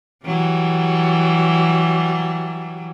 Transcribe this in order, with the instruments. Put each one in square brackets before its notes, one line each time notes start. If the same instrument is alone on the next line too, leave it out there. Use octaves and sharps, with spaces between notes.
[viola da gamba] E3 F#3 G3